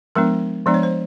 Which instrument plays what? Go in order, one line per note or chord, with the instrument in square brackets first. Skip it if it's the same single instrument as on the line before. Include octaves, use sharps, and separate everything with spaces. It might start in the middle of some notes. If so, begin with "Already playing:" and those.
[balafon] F3 G#3 B3 D4 A#4
F3 G#3 B3 D4 D5
C#5
C5